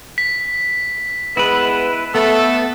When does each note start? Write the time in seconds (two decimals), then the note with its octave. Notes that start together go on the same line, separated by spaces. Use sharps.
0.18 B6
1.37 G#3 B3 E4 B4
2.15 A3 B3 A4